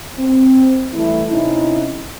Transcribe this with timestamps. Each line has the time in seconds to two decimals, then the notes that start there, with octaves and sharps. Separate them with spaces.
0.18 C4
0.94 E3 G3 A3 E4
1.30 C3 C#4 D#4 E4